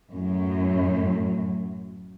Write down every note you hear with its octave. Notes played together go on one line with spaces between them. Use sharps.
F#2 A2 F#3